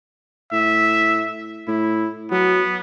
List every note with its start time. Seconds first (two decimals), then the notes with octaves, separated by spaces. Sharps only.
0.52 A2 E5
1.68 A2 E4
2.31 F#3 B3